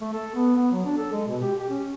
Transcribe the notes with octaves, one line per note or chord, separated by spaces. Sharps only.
A3
A4
B3
B3
F#3
D4
A4
G#3
B2
G4
G4
C#4